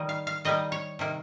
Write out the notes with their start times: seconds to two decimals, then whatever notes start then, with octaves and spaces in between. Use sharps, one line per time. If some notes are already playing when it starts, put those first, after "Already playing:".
Already playing: D#3 G3 A#3 D#5
0.09 F5
0.27 F5
0.45 D#3 G3 A#3 D#5
0.72 C#5
0.99 C3 D#3 A#3